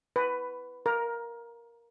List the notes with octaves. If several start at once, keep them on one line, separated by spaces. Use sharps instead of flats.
B4
A#4